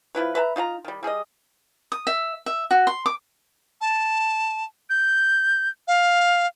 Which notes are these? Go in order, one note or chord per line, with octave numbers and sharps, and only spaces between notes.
F3 A3 E4 B4
B4 E5 A5 A#5
D#4 F4 F#5 A#5
D#3 G3
G3 G#4 A4 D#5
D#6
E5
E5
F#4
C6
D6
A5
G6
F5